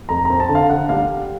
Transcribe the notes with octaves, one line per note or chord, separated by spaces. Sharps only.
F2 A#5
A#5
C4
A5
D3
F5
D3 F#5
G3 F5